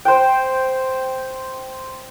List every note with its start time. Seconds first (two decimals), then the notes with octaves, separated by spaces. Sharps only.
0.05 C5 G5